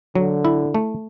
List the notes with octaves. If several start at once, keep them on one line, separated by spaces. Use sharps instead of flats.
D3 F#3
E4
A3